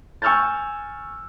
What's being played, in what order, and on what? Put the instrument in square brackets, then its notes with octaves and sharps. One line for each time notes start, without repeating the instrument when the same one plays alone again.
[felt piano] G#5 C#6 E6 F6 G6 A6